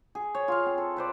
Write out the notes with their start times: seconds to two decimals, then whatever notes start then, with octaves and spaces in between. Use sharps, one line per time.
0.15 G#4
0.35 C#5
0.48 F4 F5
0.66 C4
0.78 A4
0.97 B4 C5 D5